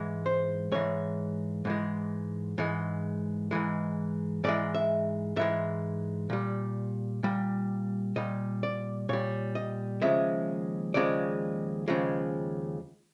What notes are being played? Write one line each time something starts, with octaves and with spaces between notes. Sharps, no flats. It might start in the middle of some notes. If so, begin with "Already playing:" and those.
Already playing: G#2 E3 G#3
C5
G#2 E3 G#3 C#5
G#2 E3 G#3
G#2 E3 G#3
G#2 E3 G#3
G#2 E3 G#3 D5
E5
G#2 E3 G#3 E5
A#2 G3
A#2 G3
A#2 G3 D#5
D5
A#2 G3 C#5
D#5
D#2 C#3 F3 G#3 E5
D#2 C#3 F3 G#3 D5
D#2 C#3 F3 G#3